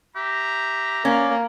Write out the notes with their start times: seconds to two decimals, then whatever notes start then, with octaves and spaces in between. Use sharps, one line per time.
0.16 G4 E5 A#5
1.05 A#3 C#4 D5